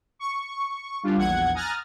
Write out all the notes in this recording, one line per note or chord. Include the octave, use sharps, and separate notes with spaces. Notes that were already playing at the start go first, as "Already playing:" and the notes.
C#6
G3 D4 F4
A#1 E2 F#5 G#6
G#5 A#5 D#6 F6 F#6 A6